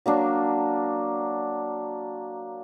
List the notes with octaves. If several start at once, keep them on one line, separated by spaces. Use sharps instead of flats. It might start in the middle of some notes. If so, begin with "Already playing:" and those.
F#3 A#3 D4